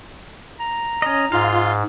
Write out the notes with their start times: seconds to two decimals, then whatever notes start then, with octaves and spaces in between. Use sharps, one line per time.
0.60 A#5
1.02 C#4 D#5
1.32 G#2 F4 F5 C6